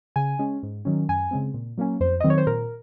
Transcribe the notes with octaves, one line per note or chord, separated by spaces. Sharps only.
C#3 G#5
G#3 C#4
G#2
D#3 F#3 C#4
F#2 G#5
C#3 G#3 C4
A#2
F#3 A#3 C#4
F2 C5
D#3 F#3 C4 D#5
C#5
C5
A#2 A#4